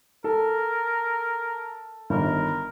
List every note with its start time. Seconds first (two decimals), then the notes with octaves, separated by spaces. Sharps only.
0.24 A4 A#4
2.10 G1 D#3 A#4